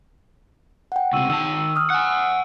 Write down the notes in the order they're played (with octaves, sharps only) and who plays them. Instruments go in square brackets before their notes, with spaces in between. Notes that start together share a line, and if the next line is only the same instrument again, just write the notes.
[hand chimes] F#5 G5
[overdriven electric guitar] C#2 C3 [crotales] C#6 E6 D#7
[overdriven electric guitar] D#3 A5 [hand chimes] G5 [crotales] E6
[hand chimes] D#6 F6
[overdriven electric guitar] F#5 G#5 [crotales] F#6